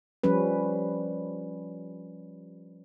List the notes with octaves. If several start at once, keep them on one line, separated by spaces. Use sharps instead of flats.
F3 G3 C#4 B4